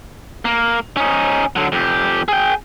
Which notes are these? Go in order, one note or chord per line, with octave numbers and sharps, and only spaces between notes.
A#3
C#4 D#4
D3 F#3
F2 G4
G#4 G5